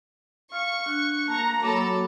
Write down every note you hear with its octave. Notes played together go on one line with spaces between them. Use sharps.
F5 C#6
D4 F#5
A#3 A5 A#5
F#3 A#3 A4 B5 D6